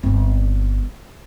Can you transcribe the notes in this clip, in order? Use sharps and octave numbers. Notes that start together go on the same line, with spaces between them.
G1 C4